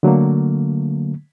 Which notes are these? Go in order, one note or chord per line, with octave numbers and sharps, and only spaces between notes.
D3 F#3 A3 A#3